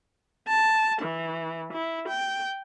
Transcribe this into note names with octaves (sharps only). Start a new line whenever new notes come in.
A5
E3
E4
G5